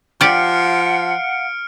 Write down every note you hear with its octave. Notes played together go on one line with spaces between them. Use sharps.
F3 G4 D5 F5 F#5 F6 C#7 D7